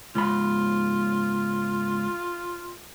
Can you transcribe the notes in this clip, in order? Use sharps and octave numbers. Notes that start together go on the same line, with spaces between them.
C#2 G#2 F4 B5